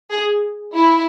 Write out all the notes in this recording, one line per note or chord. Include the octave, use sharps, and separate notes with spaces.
G#4
E4